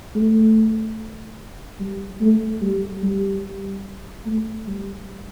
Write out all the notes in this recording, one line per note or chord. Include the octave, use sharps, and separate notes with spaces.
A3
G3
A3
G3
G3
A3
G3